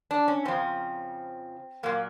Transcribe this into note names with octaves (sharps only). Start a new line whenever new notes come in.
D4
C#4
F2 C#3 F3 C4
A#2 F#3 A#3